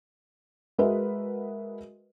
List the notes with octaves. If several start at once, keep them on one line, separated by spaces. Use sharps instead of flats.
G#3 F#4 A#4 B4 D#5 E5